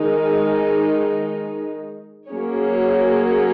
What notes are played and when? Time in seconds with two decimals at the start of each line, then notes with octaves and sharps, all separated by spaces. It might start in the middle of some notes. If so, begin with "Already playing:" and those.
Already playing: D#3 G#3 D#4
2.28 F#3 A#3 C#4 G#4 C#5